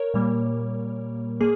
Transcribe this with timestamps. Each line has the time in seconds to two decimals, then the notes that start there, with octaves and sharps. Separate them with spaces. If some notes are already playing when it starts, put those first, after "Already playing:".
Already playing: A#4 C#5
0.14 A#2 G3 A#3
1.41 A#3 G#4